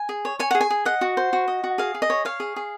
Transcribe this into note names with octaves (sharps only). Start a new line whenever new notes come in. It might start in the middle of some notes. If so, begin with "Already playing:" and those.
Already playing: G#5
G#4
C#5
C#5 G#5
G#4 F#5
G#5
G#4
D#5 F#5
F#4
C5
F#4
D#5
F#4
G#4 F5
G#4
D#5
C#5
C#5 F5
G#4
G#4